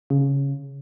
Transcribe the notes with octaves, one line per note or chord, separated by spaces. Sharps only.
C#3